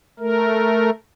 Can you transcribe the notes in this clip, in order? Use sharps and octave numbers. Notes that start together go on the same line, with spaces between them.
A3 A#4